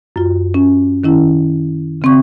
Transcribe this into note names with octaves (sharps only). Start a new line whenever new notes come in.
F#2 F4
C#4
D#3 C#4 E4
C#3 C4 C#6